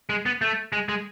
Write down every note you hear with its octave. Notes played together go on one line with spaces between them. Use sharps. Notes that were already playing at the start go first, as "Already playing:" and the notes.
G#3
B3
A3
G#3
G#3